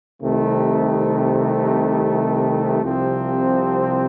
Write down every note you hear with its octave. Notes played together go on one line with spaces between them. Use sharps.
C2 C3 D#3 A3
C2 C3 F3 C4